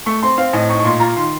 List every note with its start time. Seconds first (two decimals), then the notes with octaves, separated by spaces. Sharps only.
0.06 A3 C#6
0.23 C4 C6
0.38 C4 F5
0.53 A2 D#5
0.69 D#4 C#6
0.80 C#6
0.84 A#2 C6
1.00 F4 A#5
1.17 D#3 C6